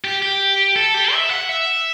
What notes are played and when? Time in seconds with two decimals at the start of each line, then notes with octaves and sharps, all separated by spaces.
0.04 G4
0.22 G4
0.76 A4
0.94 G4
1.13 E5
1.30 F#5
1.49 E5